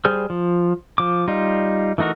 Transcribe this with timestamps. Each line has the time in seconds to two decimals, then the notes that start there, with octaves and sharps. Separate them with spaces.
0.05 G3 G#4 C5 F6
0.30 F3
0.98 F3 D6
1.28 G3 D#4 F4
1.98 E3 A3 D#4 F#4 A#4